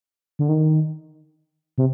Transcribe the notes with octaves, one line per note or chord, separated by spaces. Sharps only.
D3
D#3
C3